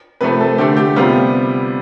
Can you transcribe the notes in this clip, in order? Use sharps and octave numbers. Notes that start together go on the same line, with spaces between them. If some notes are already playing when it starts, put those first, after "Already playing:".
C3 F3 A3 B4
A4
D3 A3 G4
G4
C3 G3 B3 F4